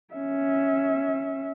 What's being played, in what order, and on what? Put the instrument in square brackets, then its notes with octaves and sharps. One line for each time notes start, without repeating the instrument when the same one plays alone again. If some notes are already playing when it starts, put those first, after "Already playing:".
[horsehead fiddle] C#4 E5